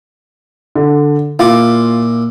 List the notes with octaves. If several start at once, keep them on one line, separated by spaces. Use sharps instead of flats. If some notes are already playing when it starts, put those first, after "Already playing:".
D3
A#2 E4 F4 D6